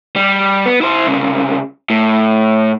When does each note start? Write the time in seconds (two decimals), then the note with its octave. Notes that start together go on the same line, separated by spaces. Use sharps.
0.16 G3
0.66 B3
0.81 E4 C5
1.07 C2 C#3
1.90 A2